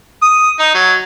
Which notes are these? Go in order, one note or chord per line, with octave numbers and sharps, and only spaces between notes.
D#6
D#4
F#3